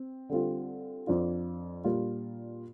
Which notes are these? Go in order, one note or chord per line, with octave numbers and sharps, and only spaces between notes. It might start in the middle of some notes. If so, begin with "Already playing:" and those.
Already playing: C4
D3 G3 C4 F4
F2 F3 D4 F4
A#2 G3 D4 F4